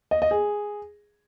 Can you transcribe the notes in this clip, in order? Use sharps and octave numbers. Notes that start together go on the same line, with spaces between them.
D#5
D#5
G#4